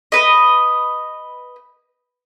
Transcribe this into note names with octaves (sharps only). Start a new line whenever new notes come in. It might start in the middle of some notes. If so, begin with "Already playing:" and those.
B4 D#5